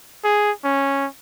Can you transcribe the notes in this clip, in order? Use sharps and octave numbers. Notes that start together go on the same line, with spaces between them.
G#4
C#4